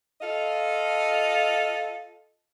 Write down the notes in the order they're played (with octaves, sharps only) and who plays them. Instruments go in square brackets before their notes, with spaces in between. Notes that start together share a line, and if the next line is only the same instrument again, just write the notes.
[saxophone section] F4 A4 D#5 F5